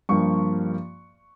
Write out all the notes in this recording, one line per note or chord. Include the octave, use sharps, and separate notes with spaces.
G2 F3 A#3 C#6